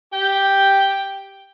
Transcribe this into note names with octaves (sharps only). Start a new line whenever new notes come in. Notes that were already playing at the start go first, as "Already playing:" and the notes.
G4 G5